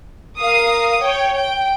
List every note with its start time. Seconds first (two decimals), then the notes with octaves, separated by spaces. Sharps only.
0.39 A#4 F5 D#6
1.03 C#5 G5
1.34 G5